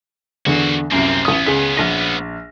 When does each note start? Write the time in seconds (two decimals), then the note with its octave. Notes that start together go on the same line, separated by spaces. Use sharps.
0.46 E2 D3 A#3 F#4
0.92 C2 F#2 A#3 C4
1.25 A1 B3 C#4 D#6
1.46 C#2 G#4 B6
1.77 A#1 A#6